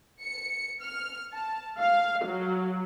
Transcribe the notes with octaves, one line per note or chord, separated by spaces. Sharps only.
C#7
F6
A5
F5
F#3